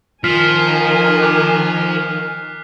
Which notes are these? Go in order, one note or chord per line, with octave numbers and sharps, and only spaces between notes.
D#3 F3 A#4 G#5 F6 B6 C7
D6 F#6